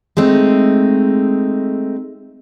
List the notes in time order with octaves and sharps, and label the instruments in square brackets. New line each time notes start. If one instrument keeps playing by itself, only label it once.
[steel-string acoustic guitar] G#3 A3 C4 D#4